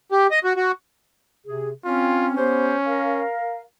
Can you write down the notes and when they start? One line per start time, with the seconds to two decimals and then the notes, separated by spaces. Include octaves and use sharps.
0.12 G4
0.31 D#5
0.44 F#4
0.56 F#4
1.46 C3 G#4
1.85 C4 C#4 F4
2.37 B3 C#4 G4 C5
2.86 A#4 F5